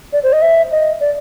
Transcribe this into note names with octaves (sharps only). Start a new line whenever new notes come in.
D5
C5
D#5
E5
D#5
D5